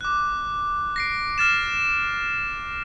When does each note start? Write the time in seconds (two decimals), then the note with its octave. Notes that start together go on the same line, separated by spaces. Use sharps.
0.01 D6 F#6
0.96 A#6 C7 D7
1.38 F6 A6 E7